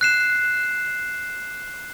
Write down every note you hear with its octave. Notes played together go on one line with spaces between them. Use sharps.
F#6 C7 E7